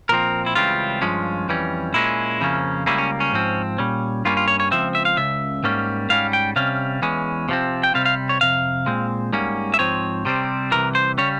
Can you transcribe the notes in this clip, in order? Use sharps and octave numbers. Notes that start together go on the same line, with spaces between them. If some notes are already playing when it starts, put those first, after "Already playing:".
A#2 F3 C4 A#4
E4
C#2 C#3 E3 G3 C4 F4
G2 F3 G#3 C#4
F2 E3 G3 C#4
A#2 G#3 C#4 E4
F2 C#3 F3 A#3 C#4
C#2 C#3 G3 A#3 C#4 E4
C#4
C#4
G#2 F3 C4
A#2 G3 C#4
G2 G3 A#3 C#4 F4
F4
C#5
C#5
C#2 C#3 F3 C4 E5
E5
F5
C#2 C#3 E5
G#2 G3 A#3 C#4
G#2 G3 C#4 F5
G5
C3 G3 C#4 F5
E2 E3 G#3 C#4
C3 F3 C4
G5
C3 G3 C4 F5
F5
C#5
F2 C3 F5
A#2 G#3 C4
G#2 G3 A#3 C#4
E5
G#2 F3 C4 C#5
C3 G3 C4
C2 C3 E3 A#4
C5
C#3 G3 C#4 C#5